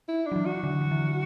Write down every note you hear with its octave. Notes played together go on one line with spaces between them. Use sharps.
E4
F#3 D4
E3
F#4
D3
F#3
E3